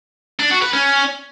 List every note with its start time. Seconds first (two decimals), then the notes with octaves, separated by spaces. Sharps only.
0.40 D4
0.51 F#4
0.62 B4
0.74 C#4